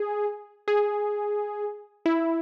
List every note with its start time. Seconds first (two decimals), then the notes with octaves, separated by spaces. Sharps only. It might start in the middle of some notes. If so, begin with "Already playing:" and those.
Already playing: G#4
0.68 G#4
2.06 E4